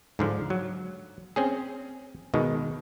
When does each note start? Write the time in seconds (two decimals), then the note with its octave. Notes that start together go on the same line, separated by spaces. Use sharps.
0.19 G#2 D3 F3
0.50 F#3
1.36 C4 C#4 G#4
2.34 B2 D#3 G#3